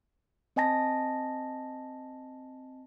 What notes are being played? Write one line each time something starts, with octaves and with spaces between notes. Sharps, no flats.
C4 D#5 G#5 A5 A#6